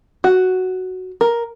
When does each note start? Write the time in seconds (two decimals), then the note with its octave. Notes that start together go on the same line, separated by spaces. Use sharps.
0.24 F#4
1.21 A#4